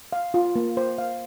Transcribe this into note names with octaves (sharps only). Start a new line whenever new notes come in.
F5
F4
A#3
C5
F5